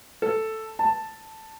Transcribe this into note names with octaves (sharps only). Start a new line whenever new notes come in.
A4
A5